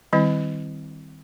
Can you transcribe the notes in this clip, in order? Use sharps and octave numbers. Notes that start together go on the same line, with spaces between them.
D#3 G3 C4 E4